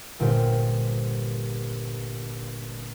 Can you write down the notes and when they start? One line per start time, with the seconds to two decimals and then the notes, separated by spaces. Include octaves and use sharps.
0.20 G1 A#2 G4 A#4 C5